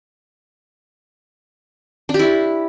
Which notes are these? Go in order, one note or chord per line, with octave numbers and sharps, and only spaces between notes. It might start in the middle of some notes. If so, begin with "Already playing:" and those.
D4
G4
E4